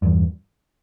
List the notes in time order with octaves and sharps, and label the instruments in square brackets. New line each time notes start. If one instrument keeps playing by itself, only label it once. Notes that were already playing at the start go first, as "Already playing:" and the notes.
[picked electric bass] E2 G2